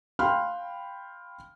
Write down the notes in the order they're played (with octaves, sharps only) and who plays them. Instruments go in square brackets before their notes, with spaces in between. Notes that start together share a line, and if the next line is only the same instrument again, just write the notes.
[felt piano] F5 G5 B5 C6 F6 F#6